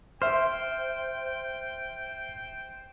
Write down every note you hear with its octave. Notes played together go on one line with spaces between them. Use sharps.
C5 E5 G5 F6